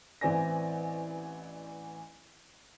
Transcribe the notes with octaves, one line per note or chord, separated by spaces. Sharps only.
A1 E3 C4 D5 G#5 A#6